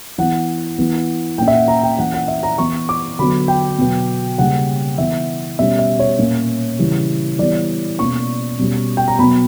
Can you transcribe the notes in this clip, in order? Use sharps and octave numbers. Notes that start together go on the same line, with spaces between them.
E3 B3 F#5
E3 B3
A#2 A#3 C#4 G5
E5
F#5
A#5
G5
E3 A#3 C#4 F#5
F#5
E5
A#5
E3 B3 C#6
D6
D3 F#3 B3 B5
G5
B2 F#3 B3
C#3 G3 A#3 C#4 F#5
E3 B3 E5
B2 G3 C#4 E5
E5
C#5
A#2 A#3 C#4
C#3 E3 G3
E3 G3 B3 D5
B2 A#3 C#4 C#6
B2 G3 C#4
G5
A#5
B2 F#3 B3 B5